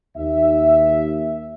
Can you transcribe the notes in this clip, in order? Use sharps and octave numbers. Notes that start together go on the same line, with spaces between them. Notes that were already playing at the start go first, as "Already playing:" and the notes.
D#2 E5